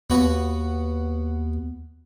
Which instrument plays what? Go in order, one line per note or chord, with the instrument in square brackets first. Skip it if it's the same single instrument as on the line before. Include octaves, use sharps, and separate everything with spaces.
[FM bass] D#2 [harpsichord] B3 F#4 C#5